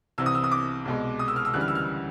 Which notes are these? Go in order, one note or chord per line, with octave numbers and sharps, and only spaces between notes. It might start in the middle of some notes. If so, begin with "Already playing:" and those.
C2 C3 E3 E6
D#6
E6
D#6
D6
C2 B2 G#3
D#6
E6
F6
E6
D2 C#3 E3 G3 F#6
F6
E6
F6